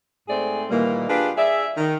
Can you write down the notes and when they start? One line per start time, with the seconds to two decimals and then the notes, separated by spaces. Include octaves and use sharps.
0.29 G#2 A3 C4 G#4 D5
0.70 A#2 D#3 E3 G3 A#3
1.09 D4 F4 G4 G#4 B4
1.38 G#4 D5 E5
1.77 D#3